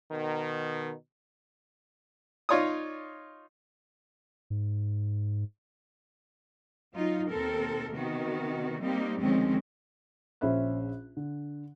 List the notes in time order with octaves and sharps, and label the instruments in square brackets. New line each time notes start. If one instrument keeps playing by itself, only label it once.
[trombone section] B2 D#3
[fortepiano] D#4 F4 C#5 D5 D#6
[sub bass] G#2
[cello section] F#3 D#4 F4
D#2 B2 C4 A4 A#4
C3 D#3 B3 F#4
G3 A#3 C4 D#4 G4
D2 D#3 F3 G#3 C4 C#4
[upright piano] A#1 C#4 C5 E5 B5 F#6
D3